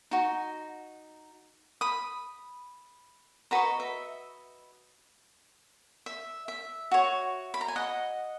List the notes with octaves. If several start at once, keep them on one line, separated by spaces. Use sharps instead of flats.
D#4 F#4
B5 D#6
F#4 B4 D#5 A#5 C#6
E5
E5
E5
F#4 C#5
B5
A#5
G#5
D#5 F#5